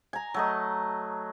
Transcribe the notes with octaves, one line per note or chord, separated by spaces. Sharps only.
G#5 A#5
F#3 A3 D#5